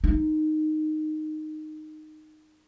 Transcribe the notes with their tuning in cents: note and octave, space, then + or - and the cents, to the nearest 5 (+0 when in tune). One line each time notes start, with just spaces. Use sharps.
D#4 -10